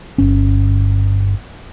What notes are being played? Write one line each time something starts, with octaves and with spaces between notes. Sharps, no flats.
G1 C#4